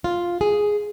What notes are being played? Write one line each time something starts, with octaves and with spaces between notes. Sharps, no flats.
F4
G#4